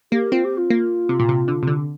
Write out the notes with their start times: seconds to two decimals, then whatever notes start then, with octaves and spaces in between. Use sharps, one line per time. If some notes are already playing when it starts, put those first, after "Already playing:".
0.12 A#3 G4
0.32 C4 F4
0.44 G4
0.57 F4
0.70 A#3
1.09 C3
1.20 A#2
1.29 C3
1.48 D3
1.63 C3
1.67 D3